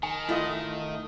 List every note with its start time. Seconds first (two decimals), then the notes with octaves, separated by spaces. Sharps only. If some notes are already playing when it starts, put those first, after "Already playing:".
0.03 D#3 G#5
0.29 A3 E4 F4 D#5